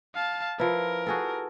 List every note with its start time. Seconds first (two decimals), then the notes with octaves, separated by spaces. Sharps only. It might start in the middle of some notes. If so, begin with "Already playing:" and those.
0.15 F5 A5
0.60 F3 E4 A#4 B4
1.07 F#4 G#4 A4